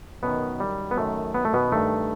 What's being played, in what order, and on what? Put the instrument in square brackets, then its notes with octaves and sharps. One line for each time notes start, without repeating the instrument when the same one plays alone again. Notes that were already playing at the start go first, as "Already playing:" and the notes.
[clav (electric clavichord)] F#2 B2 D#3 B3
G3
B3
F#2 D#3 A3
B3
A3
B2 B3
G2 D#3 A3